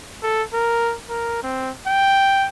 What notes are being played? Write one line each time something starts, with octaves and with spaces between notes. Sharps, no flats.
A4
A#4
A#4
C4
G5